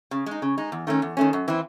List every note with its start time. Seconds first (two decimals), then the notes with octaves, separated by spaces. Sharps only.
0.11 C#3
0.26 G#3 D#4
0.42 C#3
0.58 G#3 D#4
0.72 E2
0.87 D#3 A3 C#4
1.02 E2
1.17 D#3 A3 C#4
1.33 F#2
1.48 E3 C4 E4